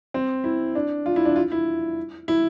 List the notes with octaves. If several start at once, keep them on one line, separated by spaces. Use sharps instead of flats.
C4
E4
D4
F4
E4
D4
F4
E4
E4